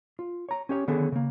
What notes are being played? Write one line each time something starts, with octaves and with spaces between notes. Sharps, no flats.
F4
C#5 A#5
C#4 G4 C#5
D3 D#3 B3 C#4 G#4 A4
C#3 A#3